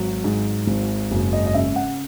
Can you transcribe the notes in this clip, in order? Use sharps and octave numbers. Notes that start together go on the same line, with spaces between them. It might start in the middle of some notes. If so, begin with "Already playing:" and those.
Already playing: G#1 F#3
G#2
G#1
F#1
D#5
D#5
C#3 E5
F#5